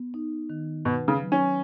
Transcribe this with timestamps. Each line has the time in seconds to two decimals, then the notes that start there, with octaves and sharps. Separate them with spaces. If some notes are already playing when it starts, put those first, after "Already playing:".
Already playing: B3
0.14 D#4
0.50 D#3
0.85 B2 B4
1.08 C#3
1.21 F#3
1.32 C#4